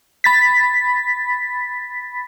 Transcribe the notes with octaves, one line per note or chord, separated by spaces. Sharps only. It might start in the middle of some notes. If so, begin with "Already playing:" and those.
B5 A6 B6